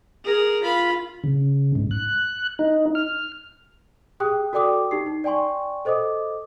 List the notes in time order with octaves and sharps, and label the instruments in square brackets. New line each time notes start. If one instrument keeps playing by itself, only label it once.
[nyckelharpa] G#4 A#4
F4 B5
[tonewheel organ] C#3
G#2
F#6
D#4
F6
[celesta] G4 G#4 G5 D#6 F#6
F#4 A4 D5 G5 D6 D#6
D#4 G4 C7
D#4
D5 G5 G#5 C6 C#6
A4 C5 D#5 D6 D#6